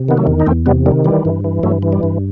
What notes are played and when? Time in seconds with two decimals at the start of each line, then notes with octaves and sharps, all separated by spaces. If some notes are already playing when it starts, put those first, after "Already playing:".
Already playing: C3
0.08 D#3 B3
0.17 F#3 A3
0.27 E2
0.40 D#4
0.46 E2 A3 C4
0.66 C3 G3 B3
0.86 D#3 G3
1.05 E3 G3
1.25 G2
1.44 E3
1.63 G2 F#3 A3
1.82 E3
1.93 G3
2.03 G2